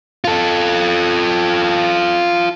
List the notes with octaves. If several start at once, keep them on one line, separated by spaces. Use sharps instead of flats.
F4 A4